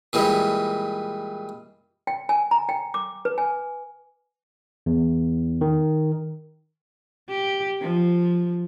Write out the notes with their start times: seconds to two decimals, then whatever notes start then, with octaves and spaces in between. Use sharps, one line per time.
0.13 A#2 E3 G3 G#3
2.07 G5
2.29 G#5
2.51 A#5
2.69 G5
2.94 D6
3.25 B4
3.38 G#5
4.86 E2
5.61 D#3
7.29 G4
7.82 F3